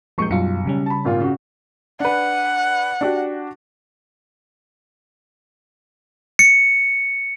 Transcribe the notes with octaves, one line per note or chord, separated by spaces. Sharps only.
D#1 F3 G#3 C#6 G6 C#7
B1 F#2 G3 F4 C#7
C#3 G3 C#4
A5 B5
G#1 A#2 F4
C#3 F#4
D4 B4 F#5
D4 F#4 G4
C#7